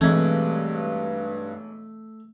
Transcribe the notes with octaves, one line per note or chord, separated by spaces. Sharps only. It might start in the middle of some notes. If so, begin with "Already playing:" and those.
B1 G2 E3 G#3 A3 C4 G#6